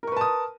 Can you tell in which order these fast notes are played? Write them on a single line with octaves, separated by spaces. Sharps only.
A#4 C#6 B4 A5 D#6